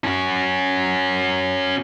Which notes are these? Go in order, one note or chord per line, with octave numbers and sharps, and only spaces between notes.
C#4 F#4